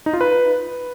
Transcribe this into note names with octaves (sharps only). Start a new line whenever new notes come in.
D#4
F4
B4